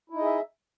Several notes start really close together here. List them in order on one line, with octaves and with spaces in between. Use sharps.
E4 D#4 D#5 G#4 E5